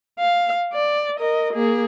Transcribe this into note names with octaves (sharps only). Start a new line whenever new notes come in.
F5
D5
A#4 D#5
A#3 G#4